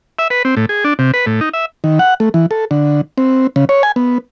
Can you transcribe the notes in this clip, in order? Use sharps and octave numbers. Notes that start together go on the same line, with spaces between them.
E5
B4
C4
A2
G#4
D4
C3
B4
A2
D#4
E5
D#3
F#5
A3
E3
A4
D3
C4
C#3
C#5
G#5
B3